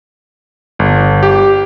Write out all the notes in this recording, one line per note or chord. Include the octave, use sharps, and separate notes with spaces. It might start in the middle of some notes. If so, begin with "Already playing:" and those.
G1
G4